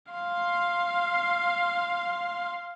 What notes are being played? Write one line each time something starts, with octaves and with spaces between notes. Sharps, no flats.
F5 C6